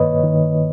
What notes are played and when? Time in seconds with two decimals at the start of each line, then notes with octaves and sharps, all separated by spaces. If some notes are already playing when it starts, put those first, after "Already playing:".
Already playing: G2 D#3 A#3 B4 C#5 D#5
0.23 D#3